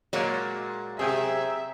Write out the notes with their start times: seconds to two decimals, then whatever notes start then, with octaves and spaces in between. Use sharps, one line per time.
0.13 A#2 F#3 G#3 A#3
0.99 C3 G#4 E5 G5 G#5